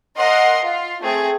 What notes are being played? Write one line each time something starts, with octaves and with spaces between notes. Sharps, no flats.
A#4 D#5 F#5 C6
F4
A3 C4 G#4